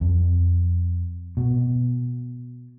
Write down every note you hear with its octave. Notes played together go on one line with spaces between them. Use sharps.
F2
B2